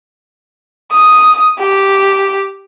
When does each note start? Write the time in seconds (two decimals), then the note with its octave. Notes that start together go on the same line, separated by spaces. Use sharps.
0.91 D#6
1.59 G4